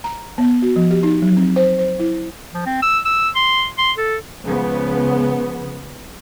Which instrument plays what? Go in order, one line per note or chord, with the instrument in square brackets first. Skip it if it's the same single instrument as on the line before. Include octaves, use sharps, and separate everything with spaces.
[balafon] A#5
B3
F#4
F3
G4
D#4
F#3
C4
C5
C5
E4
[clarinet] F3
C4
E6
E6
C6
C6
A4
[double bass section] C#2 C#3 F3 B3